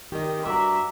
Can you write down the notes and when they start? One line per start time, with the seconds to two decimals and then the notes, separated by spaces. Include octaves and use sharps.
0.12 D#3 G4 D#5
0.46 G2 F#4 E5 A#5 D6